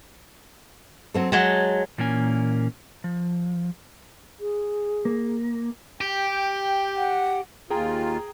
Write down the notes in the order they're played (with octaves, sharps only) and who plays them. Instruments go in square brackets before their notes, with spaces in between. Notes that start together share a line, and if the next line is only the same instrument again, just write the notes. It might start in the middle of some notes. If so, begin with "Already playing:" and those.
[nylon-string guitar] F#3 C4 A4
[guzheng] F#3 G#3 A5 [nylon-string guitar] F#5
[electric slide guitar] A#2 E3 A#3 C#4 G#5
F3
[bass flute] G#4
[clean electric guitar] A#3
[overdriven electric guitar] G4 [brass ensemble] G5
[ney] F#5
[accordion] D#2 F4 [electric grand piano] G#4 G5 A#5